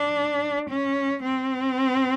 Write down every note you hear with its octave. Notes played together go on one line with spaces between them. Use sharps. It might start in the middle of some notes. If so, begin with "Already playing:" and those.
Already playing: D4
C#4
C4